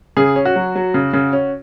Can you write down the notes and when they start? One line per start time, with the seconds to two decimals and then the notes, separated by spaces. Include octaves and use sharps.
0.17 C#3 G#4
0.36 C#4
0.45 F#4
0.56 F#3
0.76 F#3
0.94 C#3
1.13 C#3
1.33 C#4